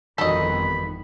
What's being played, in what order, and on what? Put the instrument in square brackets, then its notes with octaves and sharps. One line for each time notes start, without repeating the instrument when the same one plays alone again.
[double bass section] G1 F2 [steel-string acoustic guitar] D#3 E3 F#4 [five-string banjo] A4 D#5 [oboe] B5